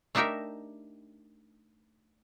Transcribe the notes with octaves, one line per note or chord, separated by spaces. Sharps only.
A3 D4 D#4 G4 A#4 E5